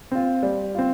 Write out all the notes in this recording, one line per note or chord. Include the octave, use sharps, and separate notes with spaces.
C4 F4
G3
C4 F4